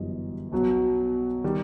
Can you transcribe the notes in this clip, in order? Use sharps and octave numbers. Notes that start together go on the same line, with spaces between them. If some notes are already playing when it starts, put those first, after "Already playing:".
Already playing: G1 F#2 E3 G3 D#5
B1 B2 F#3
D#3 G3